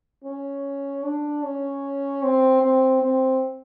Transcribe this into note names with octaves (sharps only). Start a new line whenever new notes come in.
C#4
D4
C#4
C4
C4
C4